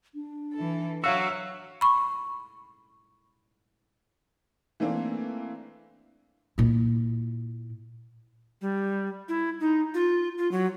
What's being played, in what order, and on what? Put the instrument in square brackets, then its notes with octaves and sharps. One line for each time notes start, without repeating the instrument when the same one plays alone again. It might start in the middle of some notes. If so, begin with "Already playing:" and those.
[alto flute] D4
[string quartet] E3 A4
[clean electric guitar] F#3 F#4 [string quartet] C#5 E5 [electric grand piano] F5 E6
[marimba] B5 C#6
[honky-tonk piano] E3 A3 A#3 C4 D4
[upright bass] A#2 E4
[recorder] G3
E4
D#4
F4
F4
F#3